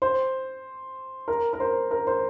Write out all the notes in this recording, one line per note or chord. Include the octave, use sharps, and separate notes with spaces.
C5
A#4
A#4
C5
A#4
C5